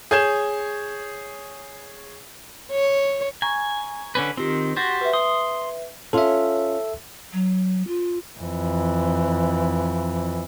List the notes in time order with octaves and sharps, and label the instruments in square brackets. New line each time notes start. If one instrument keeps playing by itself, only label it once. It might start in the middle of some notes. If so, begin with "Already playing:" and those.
[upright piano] G#4 C#5 G6 G#6 E7
[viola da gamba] C#5
[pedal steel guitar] G#5 [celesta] A#5 C#6
[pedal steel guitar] D3 C#4 B4
[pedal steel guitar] D#3 C4 [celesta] F4 G4
[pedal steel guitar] F#4 G4 C5 [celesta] A6
[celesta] B4 E5
[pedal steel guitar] C6 D#6
[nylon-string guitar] C#4 F4 [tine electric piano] A4 E5
[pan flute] F#3
F4
[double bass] F2 E3